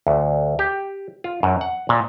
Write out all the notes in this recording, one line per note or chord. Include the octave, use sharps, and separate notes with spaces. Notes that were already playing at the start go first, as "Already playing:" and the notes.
D2
G4
F4
F#2
F#5
A#2